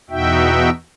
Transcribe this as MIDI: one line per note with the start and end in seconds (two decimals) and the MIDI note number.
0.10 0.70 40
0.10 0.70 47
0.10 0.70 63
0.10 0.70 66
0.10 0.70 76
0.10 0.70 79